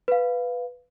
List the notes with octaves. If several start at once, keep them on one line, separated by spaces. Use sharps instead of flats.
B4 F5